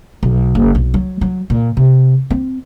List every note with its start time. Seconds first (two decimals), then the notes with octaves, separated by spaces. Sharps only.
0.23 B1
0.55 F#1
0.75 B1
0.94 F#3
1.21 F#3
1.50 A#2
1.77 C3
2.30 C4